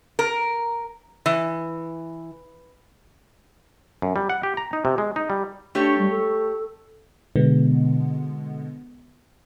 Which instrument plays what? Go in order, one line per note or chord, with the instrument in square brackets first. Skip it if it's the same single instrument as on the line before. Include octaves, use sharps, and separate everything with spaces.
[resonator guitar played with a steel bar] A#4
E3
[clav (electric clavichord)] F#2
G3
F#5
G4
A#5
D#4
C3
G#3
D#4
G3
[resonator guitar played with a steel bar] A3 G4 C#5 [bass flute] D4
[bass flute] G3
A4
[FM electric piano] B2 D3 G#3 B3